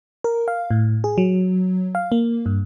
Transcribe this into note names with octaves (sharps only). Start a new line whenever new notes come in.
A#4
F5
A2
G#4
F#3
F5
A#3
G2